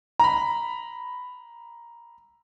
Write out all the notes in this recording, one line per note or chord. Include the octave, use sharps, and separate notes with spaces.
A#5 B5